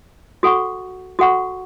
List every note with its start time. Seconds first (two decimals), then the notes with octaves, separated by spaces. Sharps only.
0.43 F#4 A4 F#5 C#6
1.19 F#4 A4 F#5 C#6